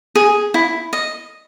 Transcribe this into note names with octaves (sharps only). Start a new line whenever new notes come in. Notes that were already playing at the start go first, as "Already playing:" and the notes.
G#4
E4
D#5